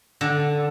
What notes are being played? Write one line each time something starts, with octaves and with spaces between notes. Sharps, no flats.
D3